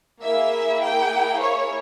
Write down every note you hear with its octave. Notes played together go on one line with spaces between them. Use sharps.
A#3 E4 G#4 E5
G5
C#5